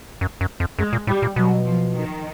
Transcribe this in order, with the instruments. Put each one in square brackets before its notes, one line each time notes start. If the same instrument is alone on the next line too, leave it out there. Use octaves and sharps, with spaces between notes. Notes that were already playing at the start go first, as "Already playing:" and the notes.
[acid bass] F#2
F#2
F2
[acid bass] F#2 [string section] G#3
[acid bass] A#2
[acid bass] A2 [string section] G3
[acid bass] A#2
[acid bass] B2 [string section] F#3
[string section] F3
D#3